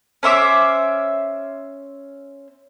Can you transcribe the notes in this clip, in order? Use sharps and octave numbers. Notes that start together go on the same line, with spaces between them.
C#4 C5 E5 D6